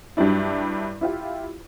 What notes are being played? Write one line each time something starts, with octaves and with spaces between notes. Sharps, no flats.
G2 F#3 G3 D4 E4
E4 F4 G4